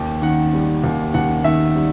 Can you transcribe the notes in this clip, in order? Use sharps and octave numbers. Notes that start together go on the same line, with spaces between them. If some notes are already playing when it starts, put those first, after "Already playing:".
Already playing: D#2 G5
D#3 F#5
G3
D#2
D#2 F#5
D#3 E5
G3